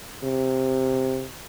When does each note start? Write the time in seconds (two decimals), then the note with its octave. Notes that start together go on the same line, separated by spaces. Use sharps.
0.24 C3